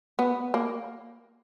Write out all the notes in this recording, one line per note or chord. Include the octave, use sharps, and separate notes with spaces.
B3
A#3